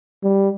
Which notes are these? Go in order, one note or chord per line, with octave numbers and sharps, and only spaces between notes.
G3